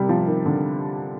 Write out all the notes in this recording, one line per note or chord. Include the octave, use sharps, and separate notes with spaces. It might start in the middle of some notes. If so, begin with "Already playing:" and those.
Already playing: C3 G3
F3
D#3
D3